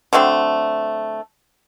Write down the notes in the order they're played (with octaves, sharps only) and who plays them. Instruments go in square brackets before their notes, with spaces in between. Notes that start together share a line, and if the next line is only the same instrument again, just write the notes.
[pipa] D3 F#3 A3 C4